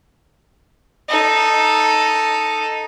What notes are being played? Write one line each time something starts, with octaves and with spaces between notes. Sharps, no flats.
D#4 A4